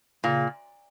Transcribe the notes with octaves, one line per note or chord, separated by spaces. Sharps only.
A#2 C#3